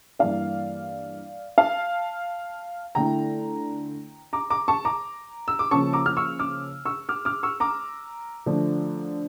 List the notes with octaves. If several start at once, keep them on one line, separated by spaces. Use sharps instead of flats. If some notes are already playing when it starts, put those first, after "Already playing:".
G2 E3 A#3 D5 F5
F5 A5
D3 A3 E4 G5 A#5
A#5 D6
A#5 D6
A5 C#6
A#5 D6
E6
D6
C#3 F3 A#3 C#4 A5 C#6
A#5 D6
F6
C#6 E6
D6 F6
C#6 E6
D6 F6
D6 F6
C#6 E6
A#5 D6
D3 F3 A3 D4